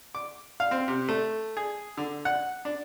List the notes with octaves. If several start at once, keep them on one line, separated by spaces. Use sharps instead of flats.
D6
F5
C4
C3
A3
G#4
D3
F#5
D4